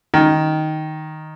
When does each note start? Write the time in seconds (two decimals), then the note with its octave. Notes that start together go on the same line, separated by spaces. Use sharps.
0.14 D#3